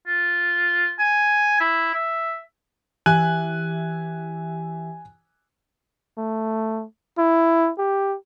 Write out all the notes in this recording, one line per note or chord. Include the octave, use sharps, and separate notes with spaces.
F4
G#5
E4
E5
E3 G4 E5 G#5 F#6
A3
E4
G4